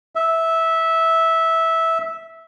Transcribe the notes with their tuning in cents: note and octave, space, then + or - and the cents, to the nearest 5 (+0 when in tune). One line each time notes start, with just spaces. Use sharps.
E5 -15